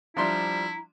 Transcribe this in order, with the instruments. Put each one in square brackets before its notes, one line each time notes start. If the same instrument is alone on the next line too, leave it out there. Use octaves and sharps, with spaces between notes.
[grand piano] F3 G3 [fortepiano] D4 E5 C6 [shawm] E4 [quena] A#5